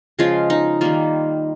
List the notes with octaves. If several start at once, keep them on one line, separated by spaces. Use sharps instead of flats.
C#3 F3 G#3 F4
D#4
D#3 G3 A#3 F4